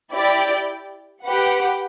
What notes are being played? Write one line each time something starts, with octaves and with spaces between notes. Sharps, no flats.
E4 G4 D5 G5
G4 B4 F#5